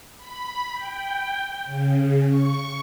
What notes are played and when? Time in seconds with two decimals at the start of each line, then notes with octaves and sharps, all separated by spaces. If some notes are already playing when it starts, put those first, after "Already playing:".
0.17 B5
0.74 G5
1.65 C#3
2.28 C#6